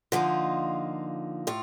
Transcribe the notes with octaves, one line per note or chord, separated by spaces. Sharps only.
D3 F3 A#3 D#4 F4
A2 F4